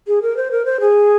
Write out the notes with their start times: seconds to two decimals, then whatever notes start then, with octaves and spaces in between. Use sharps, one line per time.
0.07 G#4
0.22 A#4
0.37 C5
0.51 A#4
0.66 C5
0.80 G#4